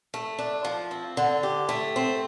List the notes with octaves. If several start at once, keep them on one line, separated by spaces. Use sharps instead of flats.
A3
D4
F3
C4
D3
G4
A3
C4